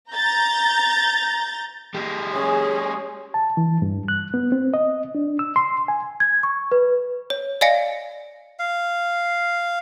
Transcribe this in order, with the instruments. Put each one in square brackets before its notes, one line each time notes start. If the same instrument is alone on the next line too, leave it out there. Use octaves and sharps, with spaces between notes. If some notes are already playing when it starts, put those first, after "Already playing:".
[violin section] A#5 G6 A6
[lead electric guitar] G#3 G4
[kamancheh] C#4 G#4
[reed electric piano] A5
E3
G2
F#6
B3
C4
D#5
D4
E6
C6
G#5
[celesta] G#6
C#6
B4
[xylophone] C#5
D5 D#5 F5 G#5 A#6 C#7
[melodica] F5